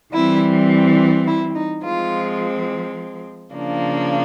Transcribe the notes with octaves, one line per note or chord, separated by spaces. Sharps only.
E3 G3 C4 E4
E4
D#4
F3 G#3 C4 F4
C#3 F3 A#3 D4